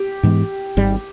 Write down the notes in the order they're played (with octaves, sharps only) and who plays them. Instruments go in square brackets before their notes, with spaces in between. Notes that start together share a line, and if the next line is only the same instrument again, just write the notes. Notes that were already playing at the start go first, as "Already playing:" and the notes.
Already playing: [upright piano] G4
[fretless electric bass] G#2 E3 G#3 B3
G#1 G#2 G3